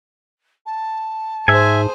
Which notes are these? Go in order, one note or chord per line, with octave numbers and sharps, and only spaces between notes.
A5
G#2 G#4 C5 E5 G#5